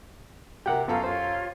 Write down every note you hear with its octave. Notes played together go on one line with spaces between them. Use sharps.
C3 G4 A#4 F#5 G5
F#2 B3 F4 A4 F5 A#5
F4 G4 C5 C#5